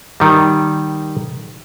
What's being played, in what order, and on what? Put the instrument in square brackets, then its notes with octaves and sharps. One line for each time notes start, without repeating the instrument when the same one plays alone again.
[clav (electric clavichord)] D#3 G3